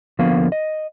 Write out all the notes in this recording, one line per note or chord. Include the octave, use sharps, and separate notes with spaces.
D3 F3 A#3 B3 F5
D#5